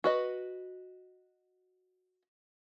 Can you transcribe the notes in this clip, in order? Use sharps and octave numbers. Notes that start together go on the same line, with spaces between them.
F#4 B4 D#5